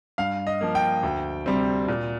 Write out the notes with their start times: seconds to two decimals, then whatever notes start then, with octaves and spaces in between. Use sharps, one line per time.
0.18 G2 F5
0.47 D#5
0.61 F3 A#3
0.75 G5
1.03 D2
1.46 C3 G3 C4
1.88 A#2